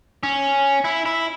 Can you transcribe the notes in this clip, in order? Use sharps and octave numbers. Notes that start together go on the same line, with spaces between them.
C#4
E4
E4